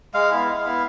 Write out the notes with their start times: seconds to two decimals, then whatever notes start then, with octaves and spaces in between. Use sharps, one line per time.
0.14 G#3 F5
0.31 B3 E4
0.49 G#3
0.65 B3 E4